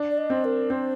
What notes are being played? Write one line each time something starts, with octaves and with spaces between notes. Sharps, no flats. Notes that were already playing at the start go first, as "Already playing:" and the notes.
Already playing: D4
D5
D#5
C4
A#4
C4 C5